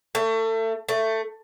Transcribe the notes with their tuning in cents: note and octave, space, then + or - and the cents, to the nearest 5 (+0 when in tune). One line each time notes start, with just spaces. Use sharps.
A3 +30
A3 +15